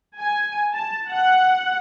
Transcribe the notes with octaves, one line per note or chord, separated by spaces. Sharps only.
G#5
A5
F#5